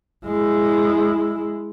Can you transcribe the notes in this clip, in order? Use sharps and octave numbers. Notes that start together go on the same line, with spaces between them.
G#3 E4